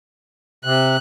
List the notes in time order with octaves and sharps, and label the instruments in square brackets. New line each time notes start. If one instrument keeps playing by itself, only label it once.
[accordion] C3 [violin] F#6